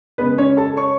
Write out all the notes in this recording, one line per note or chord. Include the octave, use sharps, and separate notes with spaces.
C#3 G#3 B3 B4
C#4 C#5
A4 A5
C#5 C#6